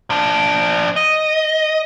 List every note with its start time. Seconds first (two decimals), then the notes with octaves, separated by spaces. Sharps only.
0.10 F3 D4
0.96 D#5